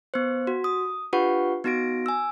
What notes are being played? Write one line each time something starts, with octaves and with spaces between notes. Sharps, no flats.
B3 C5
F#4
D#6
D4 F4 G4 B4 F#5 C#6
B3 D#4 F#4 A#6 D7
G#5 E6